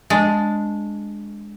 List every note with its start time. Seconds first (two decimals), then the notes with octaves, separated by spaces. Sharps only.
0.10 G#3 D4